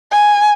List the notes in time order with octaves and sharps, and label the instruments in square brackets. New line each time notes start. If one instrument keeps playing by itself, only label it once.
[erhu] G#5